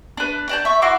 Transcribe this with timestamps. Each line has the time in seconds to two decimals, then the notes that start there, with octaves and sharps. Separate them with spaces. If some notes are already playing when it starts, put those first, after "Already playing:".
0.17 D4 B4
0.49 D5 A5 G6
0.65 E5 C#6
0.82 E4 F#4 C6 D6